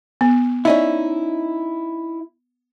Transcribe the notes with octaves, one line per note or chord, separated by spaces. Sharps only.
B3
C#4 D#4 E4 D5 E5